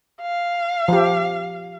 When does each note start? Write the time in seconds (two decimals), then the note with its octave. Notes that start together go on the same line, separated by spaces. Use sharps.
0.21 F5
0.88 F3 G4